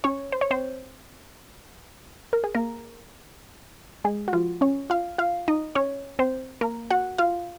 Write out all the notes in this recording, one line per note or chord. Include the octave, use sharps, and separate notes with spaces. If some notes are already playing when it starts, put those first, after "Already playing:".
C#4 C#5
C5
C#5
C4 C5
A#4
G#4
A#3 A#4
G#3 G#4
F#4
F3 F4
C#4 C#5
F4 F5
F4 F5
D#4 D#5
C#4 C#5
C4 C5
A#3 A#4
F#4 F#5
F4 F5